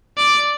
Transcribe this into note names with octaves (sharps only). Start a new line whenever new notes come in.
D5